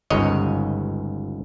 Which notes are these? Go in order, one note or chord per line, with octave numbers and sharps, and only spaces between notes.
G1 C#2 G#2 C#5 D#5